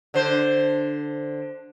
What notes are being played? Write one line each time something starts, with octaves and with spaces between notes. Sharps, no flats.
D3 C5